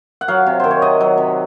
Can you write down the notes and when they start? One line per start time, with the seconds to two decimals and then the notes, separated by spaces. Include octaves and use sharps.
0.21 F#5
0.28 F#3 F5
0.47 C3
0.60 D#3 C5
0.71 C#5
0.82 C3 D#5
1.00 F#3
1.18 C3